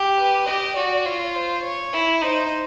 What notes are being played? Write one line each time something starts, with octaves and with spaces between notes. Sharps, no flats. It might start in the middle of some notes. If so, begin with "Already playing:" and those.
Already playing: G4
B4
G4 D#5
F#4 D5
F4 C#5
C5
C#5
E4
D#4 C5